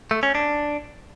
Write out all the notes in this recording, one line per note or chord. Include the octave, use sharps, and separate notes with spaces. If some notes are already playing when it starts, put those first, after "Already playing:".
A3
C#4
D4